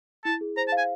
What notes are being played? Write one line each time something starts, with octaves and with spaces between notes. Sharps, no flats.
E4 A5
G#4
C5 A#5
A5
F5
G#5